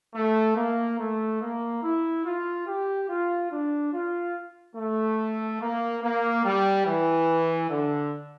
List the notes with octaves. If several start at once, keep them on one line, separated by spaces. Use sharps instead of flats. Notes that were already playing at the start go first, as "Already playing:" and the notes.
A3
A#3
A3
A#3
E4
F4
G4
F4
D4
F4
A3
A#3
A#3
G3
E3
D3